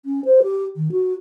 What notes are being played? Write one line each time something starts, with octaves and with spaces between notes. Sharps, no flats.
C#4
C5
G4
D#3
F#4